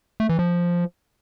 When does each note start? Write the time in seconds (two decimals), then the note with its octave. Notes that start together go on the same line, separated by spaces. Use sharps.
0.20 A3
0.29 E3
0.39 F3